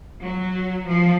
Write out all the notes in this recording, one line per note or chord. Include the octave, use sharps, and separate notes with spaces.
F#3
F3